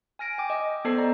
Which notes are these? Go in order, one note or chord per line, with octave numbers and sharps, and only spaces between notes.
G#5 F6 A#6 D7
G5 D6
D#5
G5
B3 A4 C5 D5 A5 C7
A#5